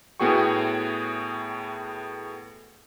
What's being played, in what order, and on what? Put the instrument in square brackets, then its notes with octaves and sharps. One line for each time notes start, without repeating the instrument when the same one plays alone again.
[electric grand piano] A2 B3 F#4 G#4 G5 C#6